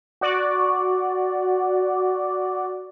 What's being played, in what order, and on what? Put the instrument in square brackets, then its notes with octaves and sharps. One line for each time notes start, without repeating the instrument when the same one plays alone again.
[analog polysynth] F#4 D5